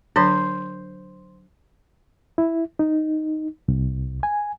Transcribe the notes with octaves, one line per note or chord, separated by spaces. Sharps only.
D3 F#3 D4 C5
E4
D#4
C2
G#5